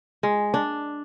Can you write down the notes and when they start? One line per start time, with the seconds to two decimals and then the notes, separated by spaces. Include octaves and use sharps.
0.23 G#3
0.54 D4